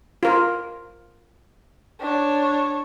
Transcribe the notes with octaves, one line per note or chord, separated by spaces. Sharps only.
F4 A#4
D4 C#5